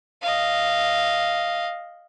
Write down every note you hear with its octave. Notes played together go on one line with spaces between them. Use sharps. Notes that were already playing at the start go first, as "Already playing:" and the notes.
D#5 F5